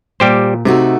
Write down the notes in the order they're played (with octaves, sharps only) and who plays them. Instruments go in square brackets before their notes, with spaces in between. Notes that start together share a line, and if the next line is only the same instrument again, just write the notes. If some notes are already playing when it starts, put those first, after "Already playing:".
[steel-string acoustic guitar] A#2 [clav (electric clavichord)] G3 G4 C5
[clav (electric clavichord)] C3 [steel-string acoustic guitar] A3 D#4 F#4